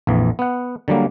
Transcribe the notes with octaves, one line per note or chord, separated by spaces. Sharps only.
A#1 F2 E3
B3 F#5
D3 F#3 G3 A#3